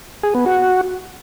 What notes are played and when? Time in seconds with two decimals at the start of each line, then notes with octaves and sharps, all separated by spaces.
0.23 G#4
0.35 B3
0.46 F#4